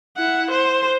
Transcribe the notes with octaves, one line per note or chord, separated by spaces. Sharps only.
E4 F#5
C5